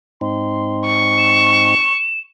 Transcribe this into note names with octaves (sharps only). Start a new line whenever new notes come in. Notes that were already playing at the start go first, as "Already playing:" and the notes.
G#2 C4 D#4 C6
C#6
E7